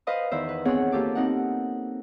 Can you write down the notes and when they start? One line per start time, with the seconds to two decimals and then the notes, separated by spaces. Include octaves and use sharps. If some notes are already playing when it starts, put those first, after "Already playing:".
0.07 B4 C5 D#5 F5 D#6
0.31 E2 D#3 C5 E5
0.49 B4
0.65 B3 C4 G#4 C#5 F#5
0.92 A#3 F4 G4 A4 D6
1.15 C4 D#4 F#5